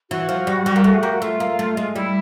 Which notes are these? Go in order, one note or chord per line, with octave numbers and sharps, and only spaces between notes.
E3 F#4
F3
G3
G3
A#3
A3 G#4
A#3 G4
F#4
A3 F4
A#3
A3
G#3
G3 E4